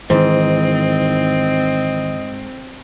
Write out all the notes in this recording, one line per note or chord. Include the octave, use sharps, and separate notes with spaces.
G#2 D#3 E3 C4 D#5